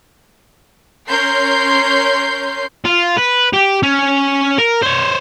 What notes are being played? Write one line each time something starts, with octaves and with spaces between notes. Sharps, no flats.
C#4 A#4 C#5 C6 G6 C7
F4
B4
G4
C#4
A#4
C5 C#5